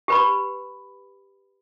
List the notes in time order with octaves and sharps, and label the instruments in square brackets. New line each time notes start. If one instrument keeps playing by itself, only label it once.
[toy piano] G4 B4 B5